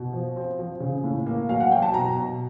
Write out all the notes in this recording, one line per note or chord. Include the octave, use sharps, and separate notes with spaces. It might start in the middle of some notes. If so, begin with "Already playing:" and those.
Already playing: B2
F3
C4
F3
C#3
A2
A#3
F#3 F5
F#5
F#3 G5
A5
B2 A#5
B2